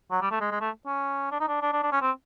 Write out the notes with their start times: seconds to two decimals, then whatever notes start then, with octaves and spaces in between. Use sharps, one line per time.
0.11 F#3
0.21 G3
0.31 A3
0.41 G#3
0.52 G#3
0.61 A3
0.86 C#4
1.31 D4
1.40 D#4
1.48 D4
1.62 D4
1.73 D4
1.83 D4
1.92 C#4
2.02 C4